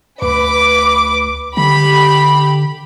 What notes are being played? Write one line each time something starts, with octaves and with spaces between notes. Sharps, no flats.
D2 B4 D6
D3 G4 B5